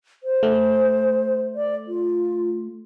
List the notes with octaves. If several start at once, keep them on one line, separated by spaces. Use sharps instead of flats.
C5
A3
D5
F4